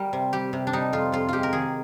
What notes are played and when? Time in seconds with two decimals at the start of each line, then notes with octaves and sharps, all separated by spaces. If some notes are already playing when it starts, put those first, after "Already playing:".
Already playing: G3 A#4
0.13 C3
0.33 G3 G4
0.53 C3
0.67 D4
0.73 G3 D#4
0.93 F2 F4
1.12 F2 F4
1.29 G#3 F4 G4
1.43 A#4
1.53 D#3 G#4